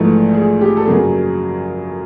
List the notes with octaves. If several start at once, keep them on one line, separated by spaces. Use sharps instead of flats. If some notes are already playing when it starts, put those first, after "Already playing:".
Already playing: A#1 G#2 E3 A3
G#4
G4
A4
F#2 C#3 F#3 A#3 G#4